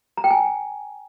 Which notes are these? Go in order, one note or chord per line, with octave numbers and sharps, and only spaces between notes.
A#5
G5
G#5